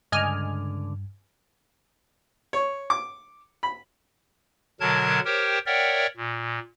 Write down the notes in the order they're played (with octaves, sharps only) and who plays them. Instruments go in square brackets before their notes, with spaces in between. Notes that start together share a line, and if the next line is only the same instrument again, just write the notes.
[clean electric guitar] C#2 D3 D5 [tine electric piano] G2 [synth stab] D#5 G#5 F6
[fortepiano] C#5
D6
B5
[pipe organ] B2 D3 F#3 A#4 A5 G#6
G4 A#4 C5 C#5 G5
A#4 C#5 D5 E5 F#5 G5
A#2